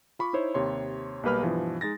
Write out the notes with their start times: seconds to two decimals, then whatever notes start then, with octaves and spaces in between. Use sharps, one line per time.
0.19 F4 B5 C#6 D6
0.33 D#4 E4 C5 C#5
0.54 D#2 C3 C#5 C6
1.23 B1 G3 A#3 B4 B5 F6
1.43 G2 B2 E3 F3
1.81 G#3 D#4 A6 A#6